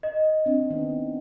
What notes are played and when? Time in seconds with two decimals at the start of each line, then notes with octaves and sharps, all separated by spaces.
0.03 D#5
0.46 C4 D4
0.70 D#3 B3 D4